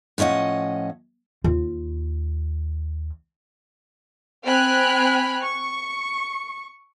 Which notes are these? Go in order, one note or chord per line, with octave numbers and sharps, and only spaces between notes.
A2 F3 C#4 D#5 F#5
D#2 F4
C4 G5 G#5 B5 F6 F#6
C#6